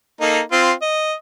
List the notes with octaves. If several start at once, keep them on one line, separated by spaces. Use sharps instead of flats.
A#3 D#4 A4
C4 F4
D#5